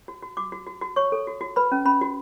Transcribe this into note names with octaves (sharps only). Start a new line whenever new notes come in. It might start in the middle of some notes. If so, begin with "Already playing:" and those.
F#4
F#4
F#4 D6
F#4
F#4
F#4
C#5 C#6
A4
F#4
F#4
B4 B5
C#4
C#4 B5
F#4